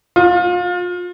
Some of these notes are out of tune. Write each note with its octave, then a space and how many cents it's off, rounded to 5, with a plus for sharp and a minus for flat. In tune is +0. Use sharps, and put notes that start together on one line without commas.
F4 +30